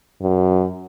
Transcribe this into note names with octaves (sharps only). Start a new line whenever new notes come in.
F#2